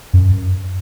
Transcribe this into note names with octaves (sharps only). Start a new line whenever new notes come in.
F#2